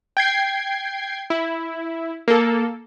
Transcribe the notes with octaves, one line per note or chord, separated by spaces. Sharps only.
G5 G#6 C7
E4
A#3 A4